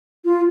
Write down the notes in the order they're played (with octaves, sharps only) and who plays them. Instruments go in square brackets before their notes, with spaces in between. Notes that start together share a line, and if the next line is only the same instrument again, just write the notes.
[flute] F4